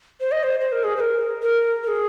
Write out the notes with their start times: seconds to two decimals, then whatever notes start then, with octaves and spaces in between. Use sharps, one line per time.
0.20 C5
0.32 D#5
0.43 C5
0.61 C5
0.72 A#4
0.84 G#4
0.97 C5
1.00 A#4
1.42 A#4
1.83 A#4
1.88 G#4